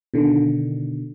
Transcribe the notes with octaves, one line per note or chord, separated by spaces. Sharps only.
B2 D3 D#3